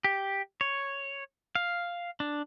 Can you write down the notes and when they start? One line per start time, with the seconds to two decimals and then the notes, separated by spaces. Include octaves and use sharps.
0.04 G4
0.61 C#5
1.55 F5
2.20 D4